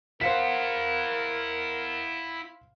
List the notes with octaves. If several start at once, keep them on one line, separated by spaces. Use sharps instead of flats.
E4 A#4 C5 F5 F#5 B6